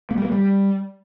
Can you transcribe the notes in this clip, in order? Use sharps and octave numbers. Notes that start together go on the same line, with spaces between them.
A#3
G3
A#3
G3